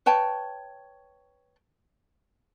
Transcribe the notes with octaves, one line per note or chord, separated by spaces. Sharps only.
B4 C#5 G5 A5